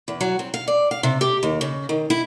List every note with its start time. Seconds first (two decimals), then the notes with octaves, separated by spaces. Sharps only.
0.08 E2
0.21 F#3
0.39 C4
0.54 F5
0.68 D5
0.91 F5
1.03 C3
1.21 G4
1.43 D#2
1.61 C#3
1.89 D#3
2.10 E4